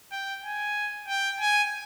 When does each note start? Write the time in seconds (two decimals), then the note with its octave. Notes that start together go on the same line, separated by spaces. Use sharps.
0.12 G5
0.44 G#5
1.08 G5
1.40 G#5